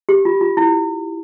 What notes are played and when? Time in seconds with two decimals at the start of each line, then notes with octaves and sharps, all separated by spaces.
0.09 G4
0.25 F4
0.41 F4
0.57 E4